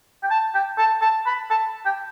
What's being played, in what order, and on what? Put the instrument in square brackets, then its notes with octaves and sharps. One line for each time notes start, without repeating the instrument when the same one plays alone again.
[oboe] G5
A5
G5
A5
A5
B5
A5
G5